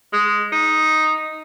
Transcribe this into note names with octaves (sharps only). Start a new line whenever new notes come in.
G#3
D#4